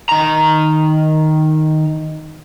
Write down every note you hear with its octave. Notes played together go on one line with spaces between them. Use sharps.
D#3 A#5